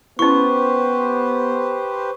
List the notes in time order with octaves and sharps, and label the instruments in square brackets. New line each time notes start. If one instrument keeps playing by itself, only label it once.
[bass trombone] B3 [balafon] C#4 E4 [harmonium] G4 B4 C5 [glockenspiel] C#6